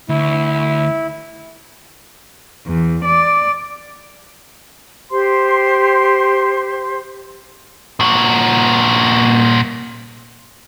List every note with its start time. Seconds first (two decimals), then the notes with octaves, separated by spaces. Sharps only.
0.09 D2 E4
2.66 E2
3.04 D5
5.11 G4 C5 C6
8.00 A#2 F#4